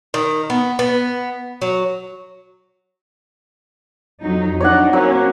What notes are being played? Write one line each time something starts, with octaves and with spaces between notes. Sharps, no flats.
D#3
B3
B3
F#3
F2 F#3 D#4
D4 D#4 C#5 D5 F#5
F#3 A#3 C#4